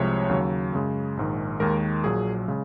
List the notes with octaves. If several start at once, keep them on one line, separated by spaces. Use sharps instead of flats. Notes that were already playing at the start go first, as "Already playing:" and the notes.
Already playing: C2 C3 F3 G#3 C#5
D#2 C#3 F#3
F#2 C#3 G#3
A#1 G#2 D#3
D#2 D#3 G#3 A#4
A#1 A#2 F#3 G#4
C#3 G#3